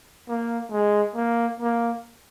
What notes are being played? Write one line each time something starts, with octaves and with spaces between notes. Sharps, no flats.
A#3
G#3
A#3
A#3